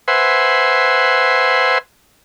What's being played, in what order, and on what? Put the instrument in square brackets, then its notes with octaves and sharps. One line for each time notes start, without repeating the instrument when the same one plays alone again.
[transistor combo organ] B4 C5 E5 F#5 G#5 C6